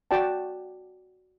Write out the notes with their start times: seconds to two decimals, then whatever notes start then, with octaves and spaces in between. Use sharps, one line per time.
0.11 F#4 D5 G5 A5